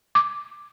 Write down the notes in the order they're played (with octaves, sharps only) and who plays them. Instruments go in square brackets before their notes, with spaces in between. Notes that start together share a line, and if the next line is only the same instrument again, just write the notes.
[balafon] D6